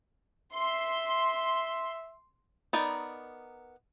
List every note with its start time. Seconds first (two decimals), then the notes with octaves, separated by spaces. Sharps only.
0.54 E5 C6
2.73 B3 D#4 A#4 D5